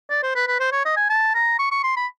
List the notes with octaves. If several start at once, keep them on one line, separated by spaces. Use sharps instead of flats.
D5
C5
B4
B4
C5
C#5
D#5
G#5
A5
A#5
C#6
C#6
C6
B5